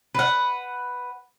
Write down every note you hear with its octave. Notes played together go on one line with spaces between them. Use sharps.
B4 F#5